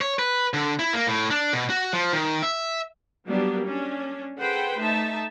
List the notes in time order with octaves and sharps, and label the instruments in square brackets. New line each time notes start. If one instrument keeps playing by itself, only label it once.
[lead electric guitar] C#5
B4
D3
E4
A#3
A2
D4
B2
F#4
F3
D#3
E5
[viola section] F#3 G3 A#3 B3 D4 G4
C#4 D4
G#4 A4 B4 C5 F#5 G5
A3 D#4 E5 A5